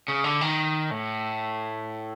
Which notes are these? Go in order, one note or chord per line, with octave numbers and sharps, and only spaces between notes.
C#3
D3
D#3
A2